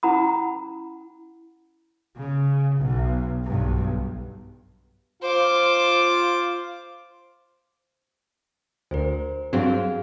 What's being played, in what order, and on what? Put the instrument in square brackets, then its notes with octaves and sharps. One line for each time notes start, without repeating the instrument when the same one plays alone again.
[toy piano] C#4 E4 F#5 A#5 B5 D#6
[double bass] C#3
B1
B1 G2
[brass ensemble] F4 [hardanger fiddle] C5 D6
[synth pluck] D2 [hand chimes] A#4 C5
[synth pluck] G2 F#3 C4 [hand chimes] F#4 G#4 F5